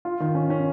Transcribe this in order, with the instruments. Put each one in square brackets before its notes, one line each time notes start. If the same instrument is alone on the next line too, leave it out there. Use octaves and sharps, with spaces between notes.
[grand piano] F4
D#3
C#4
C#4